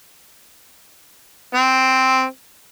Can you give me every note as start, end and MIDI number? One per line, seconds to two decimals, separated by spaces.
1.55 2.24 60